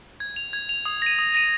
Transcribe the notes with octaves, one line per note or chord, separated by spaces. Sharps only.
G#6
F7
G#6
F7
D#6
A#6 D#7
D#6
A#6 D#7